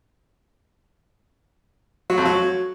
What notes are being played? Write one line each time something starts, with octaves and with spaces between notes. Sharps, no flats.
F#3
F2
F#3